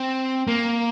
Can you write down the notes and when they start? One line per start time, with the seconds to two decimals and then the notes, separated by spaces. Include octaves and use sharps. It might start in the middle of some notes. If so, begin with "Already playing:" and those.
Already playing: C4
0.47 A#3